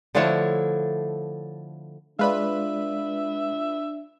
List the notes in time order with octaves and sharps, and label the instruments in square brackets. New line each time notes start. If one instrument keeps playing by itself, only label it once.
[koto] D3 F3 A3 D4 E4 C#5
[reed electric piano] G#3 D5 [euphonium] D4 [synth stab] F4 B4 B5 [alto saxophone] E5